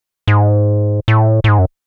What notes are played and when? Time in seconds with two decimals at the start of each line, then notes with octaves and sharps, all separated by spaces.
0.28 G#2
1.08 A2
1.44 A2
1.48 G#2
1.59 F#2